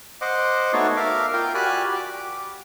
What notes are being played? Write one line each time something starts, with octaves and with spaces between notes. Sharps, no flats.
C5 D#5 F#5 D6
A3 B3 D#4 F#4 C#5 D5
A#4 E5 F5 D6
F4 A#4 G5
F#4 G4 D5 G#5 B5 F#6
D6